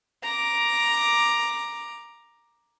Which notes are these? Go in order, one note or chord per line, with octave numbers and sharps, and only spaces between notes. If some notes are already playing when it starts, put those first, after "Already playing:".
A#5 D6